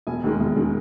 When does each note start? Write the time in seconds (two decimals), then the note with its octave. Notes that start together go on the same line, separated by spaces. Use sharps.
0.07 E1 G#5
0.24 D#2 D#3 G#3
0.40 E1
0.56 D#3 G#3